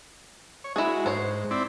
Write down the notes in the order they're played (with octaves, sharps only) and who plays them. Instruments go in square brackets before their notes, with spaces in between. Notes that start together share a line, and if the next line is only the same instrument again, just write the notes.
[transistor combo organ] C#5
[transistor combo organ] G#3 F#4 [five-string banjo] E4 G#4
[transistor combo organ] G#2 [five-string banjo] C5 C#5
[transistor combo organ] C4 E4 D5